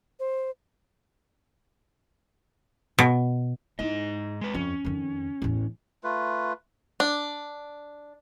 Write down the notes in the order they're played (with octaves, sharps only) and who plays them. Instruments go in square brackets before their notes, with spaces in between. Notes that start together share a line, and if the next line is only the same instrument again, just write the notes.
[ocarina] C5
[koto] B2
[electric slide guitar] G#2 D#5 [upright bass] D#4 E4
[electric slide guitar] G#3 B4
[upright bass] F2 [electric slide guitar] C#4
[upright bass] F2 D#3
A1 E2
[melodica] A3 F4 B4
[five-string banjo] D4